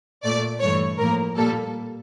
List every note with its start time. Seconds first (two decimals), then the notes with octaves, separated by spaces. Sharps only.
0.24 A#2 A3 D5
0.61 G2 E3 A3 C#5
0.99 A2 F3 A#3 A#4
1.36 A#2 G3 A#3 A4